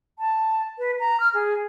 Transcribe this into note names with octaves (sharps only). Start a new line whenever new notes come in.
A5
B4
A#5
F6
G#4